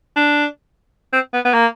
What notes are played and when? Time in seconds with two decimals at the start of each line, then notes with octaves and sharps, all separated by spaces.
0.16 D4
1.13 C4
1.33 B3
1.45 B3
1.54 A#3